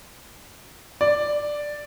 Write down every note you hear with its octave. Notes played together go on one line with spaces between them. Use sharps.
D5